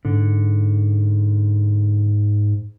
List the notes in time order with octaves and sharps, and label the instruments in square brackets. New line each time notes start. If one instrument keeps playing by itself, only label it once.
[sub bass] G#2 [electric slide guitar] D3